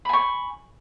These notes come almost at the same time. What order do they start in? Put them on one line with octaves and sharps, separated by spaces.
B5 G#5 C#6